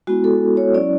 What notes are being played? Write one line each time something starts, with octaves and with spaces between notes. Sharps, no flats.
G#3 B3 E4 F#4
A4
C#5
F#3 C#4 E4 D5